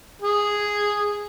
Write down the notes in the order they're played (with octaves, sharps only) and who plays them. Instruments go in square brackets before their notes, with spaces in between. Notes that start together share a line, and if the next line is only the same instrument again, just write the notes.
[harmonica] G#4